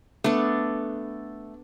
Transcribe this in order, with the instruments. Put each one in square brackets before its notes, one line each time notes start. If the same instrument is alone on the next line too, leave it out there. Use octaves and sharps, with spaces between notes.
[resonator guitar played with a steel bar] A3 [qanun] B3 D4